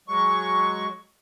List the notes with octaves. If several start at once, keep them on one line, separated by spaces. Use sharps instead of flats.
F#3 G#3 C#6